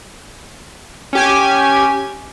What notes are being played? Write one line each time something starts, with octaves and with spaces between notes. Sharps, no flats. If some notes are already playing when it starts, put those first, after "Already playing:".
C#4 G4 G#5